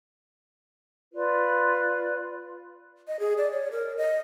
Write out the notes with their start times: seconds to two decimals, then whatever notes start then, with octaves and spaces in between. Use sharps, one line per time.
1.14 F4 B4 D5
3.08 D#5
3.20 G#4
3.38 D5
3.52 C#5
3.72 A#4
3.97 D#5